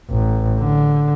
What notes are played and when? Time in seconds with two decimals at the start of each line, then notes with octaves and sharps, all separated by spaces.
0.10 A1
0.60 D3